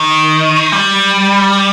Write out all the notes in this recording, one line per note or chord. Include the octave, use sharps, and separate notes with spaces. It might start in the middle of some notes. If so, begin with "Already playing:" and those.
Already playing: D#3
G3